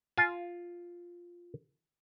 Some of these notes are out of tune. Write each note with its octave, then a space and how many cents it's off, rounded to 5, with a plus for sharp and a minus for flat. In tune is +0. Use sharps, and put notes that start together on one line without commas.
F4 +0 G#5 +40